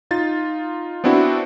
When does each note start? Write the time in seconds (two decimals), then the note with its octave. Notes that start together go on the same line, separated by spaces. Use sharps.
0.11 D#4 F4 A6
1.04 B3 C4 D4 E4 F#4